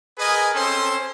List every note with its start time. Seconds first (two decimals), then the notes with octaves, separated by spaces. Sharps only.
0.19 G#4 A#4 B4 D#5 G#5
0.54 C4 C#4 A4 C5 C6